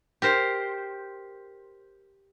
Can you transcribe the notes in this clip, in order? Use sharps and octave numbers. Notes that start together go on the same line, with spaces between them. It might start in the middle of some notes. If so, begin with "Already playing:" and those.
G4 A#4 C5